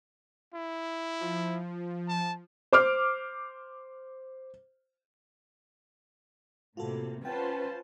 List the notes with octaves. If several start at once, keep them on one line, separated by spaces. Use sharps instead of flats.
E4
F3
A5
C5 D6 F6
A2 C3 A#3 F4 F#4 A4
C#4 F4 B4 C5 F#5 G5 A5